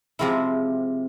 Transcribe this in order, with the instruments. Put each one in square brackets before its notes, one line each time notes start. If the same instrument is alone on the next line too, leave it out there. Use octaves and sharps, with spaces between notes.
[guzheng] C3 F3 G#3 C4 E4